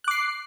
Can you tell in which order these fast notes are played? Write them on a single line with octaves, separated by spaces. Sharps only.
F#6 D6 C7